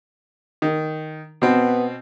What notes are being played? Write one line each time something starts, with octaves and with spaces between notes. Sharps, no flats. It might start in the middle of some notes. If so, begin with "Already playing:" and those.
D#3
B2 B3 C4